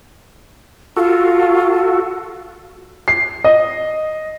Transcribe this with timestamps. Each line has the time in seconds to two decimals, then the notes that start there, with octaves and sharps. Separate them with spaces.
0.97 F4 F#4 A4
3.08 C7
3.44 D#5